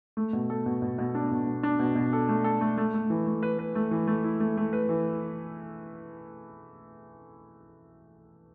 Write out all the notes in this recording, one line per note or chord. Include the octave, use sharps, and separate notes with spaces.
A3
B2
A4
B2
B2
B2
D4
B2
B2
D4
B2
B2
A4
A3
A4
A3
A3
A3
E3
A3
B4
B4
A3
E3
A3
E4
A3
A3
B4
E3